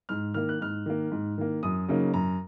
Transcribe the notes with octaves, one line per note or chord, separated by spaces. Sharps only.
G#2 F6
D#3 A#3 F6
F#6
G#2 F6
D#3 A#3
G#2
D#3 A#3
F#2 D#6
C#3 F#3 A#3 D#4
F#2 A#5